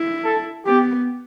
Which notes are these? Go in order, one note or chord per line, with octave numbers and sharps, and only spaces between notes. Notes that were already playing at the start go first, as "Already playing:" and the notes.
Already playing: E4
A4
B3 G4